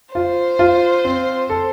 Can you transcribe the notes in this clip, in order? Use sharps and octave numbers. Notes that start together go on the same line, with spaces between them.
F4 C5
F4
C4
A4